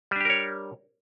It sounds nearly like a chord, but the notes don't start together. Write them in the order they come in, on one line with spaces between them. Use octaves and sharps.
G3 D4 G4 A#4 C#5